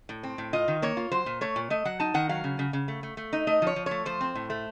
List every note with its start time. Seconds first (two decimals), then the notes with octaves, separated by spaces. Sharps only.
0.09 A2
0.23 C4
0.38 A2
0.53 F4 D#5
0.68 D#3
0.82 A#3 C#5
0.97 F4
1.11 F#3 C5
1.26 A#2
1.41 A3 C#5
1.56 A#2
1.70 A3 D#5
1.85 F#3 F#5
2.00 D#4 A5
2.14 D#3 F#5
2.29 F#3 F5
2.44 C#3
2.59 C#3
2.73 C#3
2.88 A3
3.03 A3
3.17 A3
3.33 D#4
3.47 A3 D#5
3.62 F3 C#5
3.76 F3
3.86 A3 C#5
4.05 F3 C5
4.21 C4
4.35 A2
4.50 A3